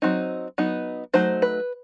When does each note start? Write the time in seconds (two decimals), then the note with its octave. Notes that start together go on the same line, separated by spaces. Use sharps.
0.02 F#3 C4 D#4
0.58 F#3 B3 D#4
1.13 F#3 A3 D#4 C5
1.42 B4